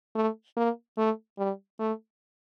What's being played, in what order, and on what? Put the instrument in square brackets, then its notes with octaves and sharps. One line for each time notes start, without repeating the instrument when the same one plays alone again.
[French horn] A3
A#3
A3
G3
A3